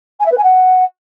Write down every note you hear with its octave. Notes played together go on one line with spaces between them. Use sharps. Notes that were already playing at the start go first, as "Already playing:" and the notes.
G#5
E5
B4
G#5
F#5